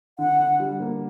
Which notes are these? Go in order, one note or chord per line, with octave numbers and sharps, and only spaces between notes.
D3 F#5
D3
G3
A#3